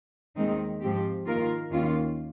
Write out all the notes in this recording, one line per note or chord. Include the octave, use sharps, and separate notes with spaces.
D#2 D#3 G#3 C4 D#4
G#2 F3 C4 G4
D#3 A#3 F4 A#4
D#2 D#3 A#3 C#4 F4